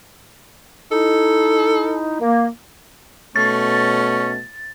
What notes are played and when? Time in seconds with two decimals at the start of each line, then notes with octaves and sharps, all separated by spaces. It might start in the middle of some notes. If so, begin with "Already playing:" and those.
0.92 D#4 E4 A4
2.20 A#3
3.36 B2 A3 C#4 A6